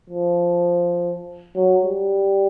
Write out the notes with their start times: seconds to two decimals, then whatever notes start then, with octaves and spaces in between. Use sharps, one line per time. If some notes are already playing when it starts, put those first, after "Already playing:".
0.10 F3
1.55 F#3
1.85 G3